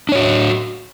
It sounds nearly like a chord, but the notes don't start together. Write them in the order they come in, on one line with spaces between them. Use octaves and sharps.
D4 C#5 F#4